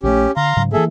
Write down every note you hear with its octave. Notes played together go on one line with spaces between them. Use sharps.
A#1 E3 A3 C#4 G4
D3 F5 A#5 C6
G#2 C#3 F#3
E3 F3 A#3 G#4 A4 E5